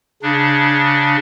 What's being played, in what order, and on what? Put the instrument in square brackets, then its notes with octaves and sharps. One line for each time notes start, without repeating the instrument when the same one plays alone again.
[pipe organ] C#3 D4